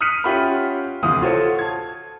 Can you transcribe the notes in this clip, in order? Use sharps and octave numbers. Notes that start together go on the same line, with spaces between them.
D#6 F6 F#6 B6 C#7 D#7
C#4 F4 G4 E5 F#5 B5
D2 C3 E3 F5 D#6
F4 F#4 A4 C5 C#5
A5 G#6